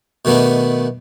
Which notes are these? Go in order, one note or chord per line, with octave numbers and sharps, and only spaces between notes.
B2 D#3 A3 B3 D4